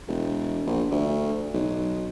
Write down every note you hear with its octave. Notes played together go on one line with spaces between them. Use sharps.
E1
A#1
D2
B1